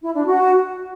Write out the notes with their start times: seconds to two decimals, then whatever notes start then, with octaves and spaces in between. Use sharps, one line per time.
0.02 E4
0.14 D4
0.26 F#4